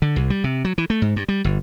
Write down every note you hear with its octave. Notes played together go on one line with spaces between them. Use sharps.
D3
C2
G3
C3
F#3
E3
A3
G#2
G2
G3
G1